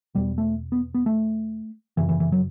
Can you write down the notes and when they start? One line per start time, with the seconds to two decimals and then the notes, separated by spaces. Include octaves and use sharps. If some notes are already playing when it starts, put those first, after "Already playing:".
0.15 E2 B2 G3
0.38 A3
0.72 B3
0.94 B3
1.06 A3
1.97 F#2 C#3 E3
2.09 E3
2.20 E3
2.32 F#3